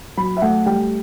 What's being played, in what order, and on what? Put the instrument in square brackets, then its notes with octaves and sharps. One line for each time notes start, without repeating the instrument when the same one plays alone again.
[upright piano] F#3 B5
E5
A3 F#5
G3 G5